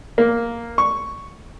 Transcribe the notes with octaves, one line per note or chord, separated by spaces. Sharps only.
A#3
C#6